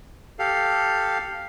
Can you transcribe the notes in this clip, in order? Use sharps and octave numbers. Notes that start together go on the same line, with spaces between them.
G4 A4 F5